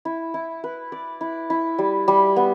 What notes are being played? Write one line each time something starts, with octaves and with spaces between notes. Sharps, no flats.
E4
E4
B4
D5
E4
E4
G3
G3
B3